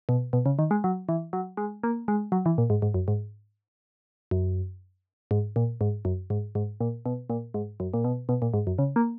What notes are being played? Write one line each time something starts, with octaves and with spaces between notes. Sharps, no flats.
B2
B2
C#3
D#3
G#3
F#3
E3
F#3
G#3
A#3
G#3
F#3
E3
A#2
G#2
G#2
F#2
G#2
F#2
G#2
A#2
G#2
F#2
G#2
G#2
A#2
B2
A#2
G#2
F#2
A#2
B2
B2
A#2
G#2
F#2
C#3
A#3